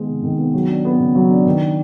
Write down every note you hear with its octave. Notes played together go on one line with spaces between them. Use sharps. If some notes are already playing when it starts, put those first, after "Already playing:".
Already playing: D#3 G#3 B3
C3
D#3
B3
F#3
D4
B3
C#3
F#3
D4
D#3